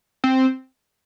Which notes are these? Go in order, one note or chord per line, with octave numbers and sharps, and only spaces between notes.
C4